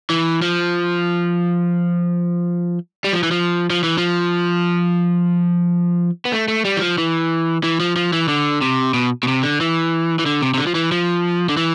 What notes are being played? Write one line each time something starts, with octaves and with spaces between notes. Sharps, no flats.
E3
F3
G3
F3
E3
F3
F3
E3
F3
B3
A3
A3
G3
E3
F3
E3
E3
F3
F3
E3
D3
C3
B2
B2
C3
D3
E3
E3
D3
C3
C3
D3
F3
E3
F3
D3
E3